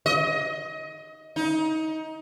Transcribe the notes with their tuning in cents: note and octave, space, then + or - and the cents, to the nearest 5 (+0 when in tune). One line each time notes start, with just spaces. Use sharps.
D#5 +20
D#4 +25